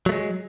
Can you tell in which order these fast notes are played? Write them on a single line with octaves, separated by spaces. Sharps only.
F#3 A3 G#3